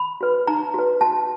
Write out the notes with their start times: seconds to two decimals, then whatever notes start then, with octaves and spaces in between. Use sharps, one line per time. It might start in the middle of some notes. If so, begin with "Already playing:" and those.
Already playing: B5
0.21 F#4 B4
0.47 D#4 A#5
0.74 F#4 B4
1.01 F#4 A5